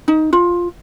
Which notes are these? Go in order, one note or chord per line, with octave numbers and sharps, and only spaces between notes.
D#4
F4